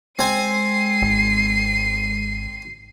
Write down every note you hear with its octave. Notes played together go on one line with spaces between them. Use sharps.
G#3 C4 G#5 C7 D#7
G#1